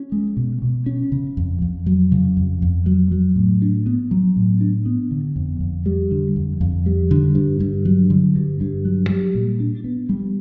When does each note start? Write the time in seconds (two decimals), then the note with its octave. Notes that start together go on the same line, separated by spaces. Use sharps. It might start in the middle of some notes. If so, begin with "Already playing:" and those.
Already playing: C#4
0.12 G#3
0.37 B2
0.62 B2
0.86 C#4
1.12 C#3
1.37 F2
1.62 F2
1.86 F#3
2.12 C#3
2.37 F2
2.62 F2
2.86 F#3
3.12 F#3
3.36 A2
3.62 D4
3.86 B3
4.11 F#3
4.37 A2
4.61 D4
4.86 B3
5.11 D3
5.36 F2
5.61 F2
5.86 G3
6.11 D3
6.36 F2
6.61 F2
6.86 G3
7.11 D3
7.35 G2
7.60 G2
7.85 F#3
8.10 D3
8.35 G2
8.61 G2
8.85 F#3
9.10 G3
9.35 A#2
9.60 D4
9.84 B3
10.09 G3